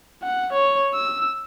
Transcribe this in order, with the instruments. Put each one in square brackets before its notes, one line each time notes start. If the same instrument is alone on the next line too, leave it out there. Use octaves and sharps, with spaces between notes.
[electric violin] F#5
C#5
E6